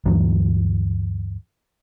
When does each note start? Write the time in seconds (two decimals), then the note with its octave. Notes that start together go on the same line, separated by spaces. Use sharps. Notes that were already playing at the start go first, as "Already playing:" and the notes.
0.06 D2 G2 E3 F#3